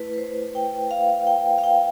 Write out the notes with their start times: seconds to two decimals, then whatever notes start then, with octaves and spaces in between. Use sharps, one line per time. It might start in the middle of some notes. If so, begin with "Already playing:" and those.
Already playing: A3 E4 B4
0.13 B4
0.18 C5
0.55 G5
0.91 F5
1.27 G5
1.58 F5
1.63 G5